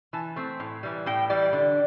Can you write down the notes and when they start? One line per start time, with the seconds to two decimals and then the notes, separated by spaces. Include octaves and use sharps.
0.13 E3 A5
0.36 A3 C4
0.60 A2
0.83 E3 G3
1.06 A2 G5
1.30 E3 G3 D5
1.53 D3